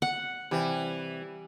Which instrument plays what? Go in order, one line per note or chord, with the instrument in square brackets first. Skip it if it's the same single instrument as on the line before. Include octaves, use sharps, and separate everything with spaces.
[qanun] F#5
[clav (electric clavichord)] C3 [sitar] E3 [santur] G3 G#5